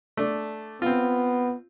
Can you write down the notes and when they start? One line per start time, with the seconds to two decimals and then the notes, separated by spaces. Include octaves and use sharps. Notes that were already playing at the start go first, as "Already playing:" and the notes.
0.17 A3 D4
0.82 B3 C4 F4